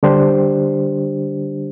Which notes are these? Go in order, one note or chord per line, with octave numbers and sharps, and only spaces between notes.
D3 G3 D4 G4 C5